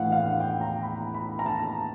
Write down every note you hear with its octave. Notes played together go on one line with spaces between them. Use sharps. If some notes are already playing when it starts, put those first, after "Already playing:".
Already playing: A2 E3 F5 F#5
F5
F#5
G5
A#5
B5
B5
A#5
A5